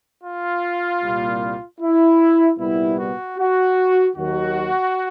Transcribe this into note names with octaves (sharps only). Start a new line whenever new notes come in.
F4
C2 A#2 G3
E4
C2 A#2 G3 B3 E4
F#4
F#4
D#2 D#3 F#3 F#4